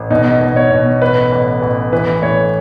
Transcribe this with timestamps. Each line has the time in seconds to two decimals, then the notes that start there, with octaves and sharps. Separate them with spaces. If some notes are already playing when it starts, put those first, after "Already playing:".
Already playing: A1
0.11 B2 D#4
0.41 B2
0.56 C#5
0.71 B2
1.02 A1 B4
1.32 A1
1.62 A1
1.93 E3 B4
2.22 A2 C#5